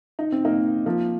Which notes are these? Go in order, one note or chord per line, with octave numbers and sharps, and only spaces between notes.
D#4
C4
A#3 D#4
F3 A#3